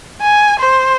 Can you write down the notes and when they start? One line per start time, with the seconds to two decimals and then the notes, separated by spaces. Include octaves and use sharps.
0.22 G#5
0.60 C5